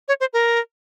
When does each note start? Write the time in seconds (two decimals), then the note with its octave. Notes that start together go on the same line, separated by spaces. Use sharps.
0.08 C#5
0.20 C5
0.33 A#4